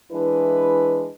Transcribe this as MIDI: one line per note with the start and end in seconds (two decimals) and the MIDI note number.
0.11 1.08 52
0.11 1.08 56
0.11 1.08 62
0.11 1.08 64
0.11 1.08 71